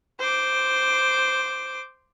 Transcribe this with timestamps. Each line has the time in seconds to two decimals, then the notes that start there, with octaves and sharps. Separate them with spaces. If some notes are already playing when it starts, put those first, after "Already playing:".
0.19 C5 D6